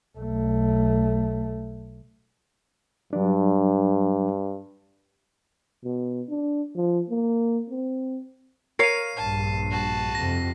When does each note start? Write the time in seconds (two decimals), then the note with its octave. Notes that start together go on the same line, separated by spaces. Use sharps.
0.17 B1 A3
3.13 G2 F#3 D4
5.85 B2
6.29 D4
6.75 F3
7.10 A#3
7.70 C4
8.79 A#4 C#5 F5 C7 D#7
9.17 A#1 G2 A5
9.69 F#4 A5
10.15 F2 C3 A#6